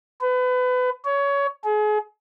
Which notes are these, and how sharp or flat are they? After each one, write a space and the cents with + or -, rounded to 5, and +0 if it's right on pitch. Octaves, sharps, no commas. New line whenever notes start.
B4 +30
C#5 +20
G#4 +35